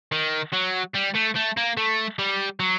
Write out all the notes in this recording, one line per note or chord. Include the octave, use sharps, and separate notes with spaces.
D#3
F#3
G3
A3
A3
A#3
A3
G3
F#3